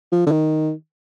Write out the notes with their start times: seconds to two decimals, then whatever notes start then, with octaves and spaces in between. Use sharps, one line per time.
0.12 F3
0.27 D3
0.31 D#3